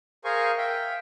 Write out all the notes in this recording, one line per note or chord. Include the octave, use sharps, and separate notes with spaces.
G#4 A#4 C5 F5 G#5 C#6
E5 F5 G5